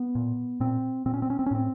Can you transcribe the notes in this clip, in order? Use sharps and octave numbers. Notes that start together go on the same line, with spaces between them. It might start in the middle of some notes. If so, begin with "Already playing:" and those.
Already playing: B3
A#2
A#2 C4
A#2 C4
C#4
C4
C#4
C4
C#4
A2 C4